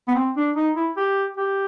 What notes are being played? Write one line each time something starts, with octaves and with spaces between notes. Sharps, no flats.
B3
C4
D4
D#4
E4
G4
G4